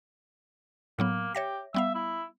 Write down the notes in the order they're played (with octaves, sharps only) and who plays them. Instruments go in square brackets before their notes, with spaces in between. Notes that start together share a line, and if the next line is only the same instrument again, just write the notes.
[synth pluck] A2 F#3 B3 [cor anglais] A#3
[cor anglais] G4 [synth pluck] C#5 E5 A#6
[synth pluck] G3 B3 F5 [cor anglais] E5
[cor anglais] E4